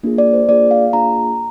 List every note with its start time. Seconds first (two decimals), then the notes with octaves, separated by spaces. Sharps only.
0.03 A#3 D4 F4 G#4
0.18 D5
0.34 C5
0.49 A#3 D4 F4 G#4 D5
0.71 F5
0.93 A#3 D4 F4 G#4 A#5